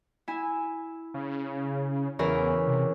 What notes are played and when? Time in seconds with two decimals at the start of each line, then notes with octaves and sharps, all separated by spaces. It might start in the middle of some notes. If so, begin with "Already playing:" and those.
0.28 E4 G#5
1.14 C#3
2.19 E2 C#3 E3 A#4
2.67 C3